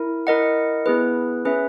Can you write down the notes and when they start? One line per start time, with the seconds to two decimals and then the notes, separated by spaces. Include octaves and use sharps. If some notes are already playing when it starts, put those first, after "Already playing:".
Already playing: E4 A#4
0.27 E4 A#4 D#5 F#5
0.86 B3 E4 G#4 B4
1.45 C#4 G#4 B4 E5